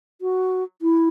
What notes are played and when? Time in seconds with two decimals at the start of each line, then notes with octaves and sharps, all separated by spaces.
0.21 F#4
0.82 E4